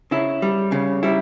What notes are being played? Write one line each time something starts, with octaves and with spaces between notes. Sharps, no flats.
C#3 E4
G3
C#3
G3 E4